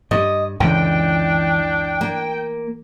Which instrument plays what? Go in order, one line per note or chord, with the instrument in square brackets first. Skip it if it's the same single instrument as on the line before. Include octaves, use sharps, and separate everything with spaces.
[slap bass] G2 [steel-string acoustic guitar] D#5
[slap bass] C#2 F#2 D3 [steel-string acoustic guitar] E3 [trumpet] D4 [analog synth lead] G5
[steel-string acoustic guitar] A#3